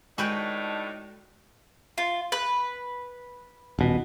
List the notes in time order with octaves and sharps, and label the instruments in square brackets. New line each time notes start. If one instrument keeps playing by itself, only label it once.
[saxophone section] A2 D4 D#4 [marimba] G#3 [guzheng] F#4 B4 G5
[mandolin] F4
B4
[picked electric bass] D#1 B2